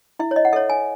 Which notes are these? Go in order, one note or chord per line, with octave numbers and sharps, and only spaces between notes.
E4 E5
C#5
D#5
F#5
A4 C#5 E5
G#5